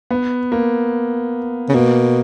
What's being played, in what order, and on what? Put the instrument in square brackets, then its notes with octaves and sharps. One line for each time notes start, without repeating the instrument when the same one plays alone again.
[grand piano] B3
A#3
[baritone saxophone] C#3
[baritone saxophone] B2 [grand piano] A#3